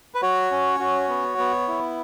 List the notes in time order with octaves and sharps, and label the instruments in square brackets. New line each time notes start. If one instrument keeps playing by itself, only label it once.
[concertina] B4
F#4 C#5
C#4
F#4
B3
B3
E4